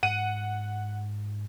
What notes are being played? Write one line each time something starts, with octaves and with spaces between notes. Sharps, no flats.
G#2 F#5 D#7